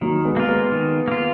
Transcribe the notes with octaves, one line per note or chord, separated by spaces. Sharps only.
D#3 F#3 A#3
G#3 B3
A#3 F4
G#3 B3
D#3
A#3 F4